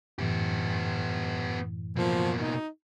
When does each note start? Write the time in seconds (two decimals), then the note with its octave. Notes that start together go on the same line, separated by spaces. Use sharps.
0.18 F#2 A2 E3 B3 G4
1.96 B2 F3 A#3
2.39 D#4